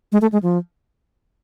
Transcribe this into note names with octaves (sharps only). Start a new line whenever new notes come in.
G#3
A3
G#3
F3